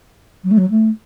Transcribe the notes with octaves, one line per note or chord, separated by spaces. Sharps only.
F#3
A3
F#3
A3